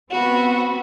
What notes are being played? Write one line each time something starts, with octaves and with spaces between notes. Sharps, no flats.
B3 C4 F#4 B5